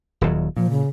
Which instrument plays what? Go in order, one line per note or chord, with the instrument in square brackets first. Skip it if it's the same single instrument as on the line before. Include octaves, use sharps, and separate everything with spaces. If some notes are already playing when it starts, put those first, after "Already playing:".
[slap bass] D#1 D#2 F#3
[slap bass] A#2 [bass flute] F3
[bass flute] C#3